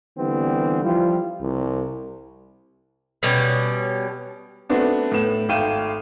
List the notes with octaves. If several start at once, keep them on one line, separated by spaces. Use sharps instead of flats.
D3 E3 G3 B3 C4
F3 G3 E4 F4
C2
B2 G3 C#4
A3 B3 C4 D4 F#4
A2 A3 B3 E7
G#1 A3 F5 G5 D#7 E7